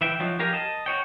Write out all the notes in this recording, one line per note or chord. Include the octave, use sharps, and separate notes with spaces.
E3 E5 G5
F3 F#3 D#4
G4 A#4 F5 G#5
D#5 A5
F#4 C#5 G5